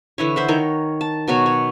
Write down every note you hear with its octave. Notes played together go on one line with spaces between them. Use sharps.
D3 E3 E4 C#5
C5 E5 F#5
D#3 A#4 C#5
A5
B2 F#3 F#4 C#5
C#5